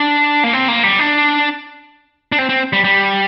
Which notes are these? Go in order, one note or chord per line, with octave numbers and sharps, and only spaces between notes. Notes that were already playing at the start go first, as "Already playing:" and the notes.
Already playing: D4
A#3
C4
A#3
G3
D4
D4
C4
C4
G3
G3